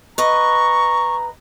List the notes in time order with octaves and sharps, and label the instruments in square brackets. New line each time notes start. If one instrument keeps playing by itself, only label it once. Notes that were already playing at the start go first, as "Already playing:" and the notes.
[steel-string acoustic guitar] B4 D#5 [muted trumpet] A#5 [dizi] C#6